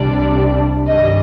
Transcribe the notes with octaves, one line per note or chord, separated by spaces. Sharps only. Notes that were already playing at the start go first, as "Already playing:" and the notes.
Already playing: C2 C3 G3 D4 D5
G2 D#3 G3 D#5